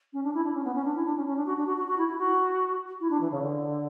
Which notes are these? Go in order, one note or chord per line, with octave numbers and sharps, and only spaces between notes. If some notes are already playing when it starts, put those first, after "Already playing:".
C#4
D4
E4
D4
C#4
B3
C#4
D4
E4
D4
C#4
C#4
D4
F#4
D4
F#4
F#4
F#4
E4
E4
F#4
E4
D4
E3
C#3
D3